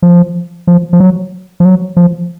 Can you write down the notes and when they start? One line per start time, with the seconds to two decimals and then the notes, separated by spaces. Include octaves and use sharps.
0.02 F3
0.67 F3
0.93 F3
1.00 F#3
1.60 F3
1.65 F#3
1.97 F3